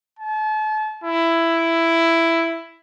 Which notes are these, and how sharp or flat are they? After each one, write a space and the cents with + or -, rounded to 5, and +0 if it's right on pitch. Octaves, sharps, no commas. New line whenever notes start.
A5 -35
E4 +10